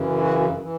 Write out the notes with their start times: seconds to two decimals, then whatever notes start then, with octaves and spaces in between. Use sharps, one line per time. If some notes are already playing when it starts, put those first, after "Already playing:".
Already playing: F#2 C#3 E3
0.21 F#4
0.62 E3